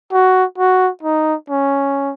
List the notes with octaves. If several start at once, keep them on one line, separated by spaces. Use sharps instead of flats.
F#4
F#4
D#4
C#4